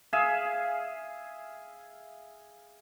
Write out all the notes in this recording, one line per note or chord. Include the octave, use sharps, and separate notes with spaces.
G#4 E5 F5